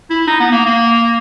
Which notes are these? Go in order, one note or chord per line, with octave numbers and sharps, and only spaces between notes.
E4
D#4
B3
A#3
A#3